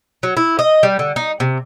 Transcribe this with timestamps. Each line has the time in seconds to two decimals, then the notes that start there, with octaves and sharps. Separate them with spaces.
0.23 F#3
0.37 E4
0.59 D#5
0.83 G3
0.99 D3
1.16 D#4
1.40 C3